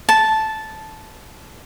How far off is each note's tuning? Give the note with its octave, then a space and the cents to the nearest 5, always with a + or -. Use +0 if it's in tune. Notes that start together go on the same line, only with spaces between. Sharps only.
A5 -10